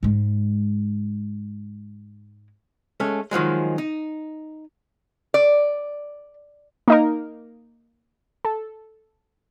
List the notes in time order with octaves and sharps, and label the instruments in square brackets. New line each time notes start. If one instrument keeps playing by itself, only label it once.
[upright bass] G#2 G#3
[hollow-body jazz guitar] G#3 A3 C#4
D#3 F3 F#3 G#3
D#4
[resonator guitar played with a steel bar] D5
[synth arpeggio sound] A#3 D#4 A#4
A4